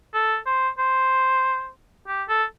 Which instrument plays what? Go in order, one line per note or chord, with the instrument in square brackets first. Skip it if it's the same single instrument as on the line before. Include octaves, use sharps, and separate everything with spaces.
[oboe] A4
C5
C5
G4
A4